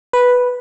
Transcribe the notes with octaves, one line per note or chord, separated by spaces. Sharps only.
B4